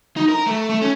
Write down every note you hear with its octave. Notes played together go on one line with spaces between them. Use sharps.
D#4
A#4
A3
A3
C#4